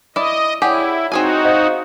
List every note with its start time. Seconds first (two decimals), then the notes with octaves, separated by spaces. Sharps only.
0.16 E4 D5 D#5
0.62 E4 G4 G#4 C#5 D5 F#5
1.12 C4 D#4 F#4 G#4 G#5
1.45 C5 D#5 F5